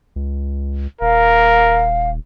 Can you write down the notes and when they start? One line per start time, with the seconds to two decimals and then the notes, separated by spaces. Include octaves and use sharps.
0.16 C#2
1.01 D#1 A#4 F5